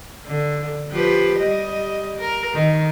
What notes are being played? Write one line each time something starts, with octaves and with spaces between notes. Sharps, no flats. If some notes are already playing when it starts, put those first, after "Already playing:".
D3
F3 G4 B4
G3 D#5
A#4
D#3